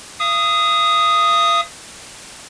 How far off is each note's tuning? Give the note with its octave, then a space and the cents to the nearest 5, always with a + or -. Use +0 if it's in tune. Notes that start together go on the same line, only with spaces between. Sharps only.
F5 -40 D#6 +0